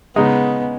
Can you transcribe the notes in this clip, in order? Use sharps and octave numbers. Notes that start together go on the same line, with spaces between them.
C#3 G#3 B3 D#4